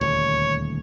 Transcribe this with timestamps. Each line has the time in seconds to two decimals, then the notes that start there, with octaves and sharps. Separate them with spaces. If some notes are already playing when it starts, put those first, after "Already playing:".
0.01 D#1 D2 C#5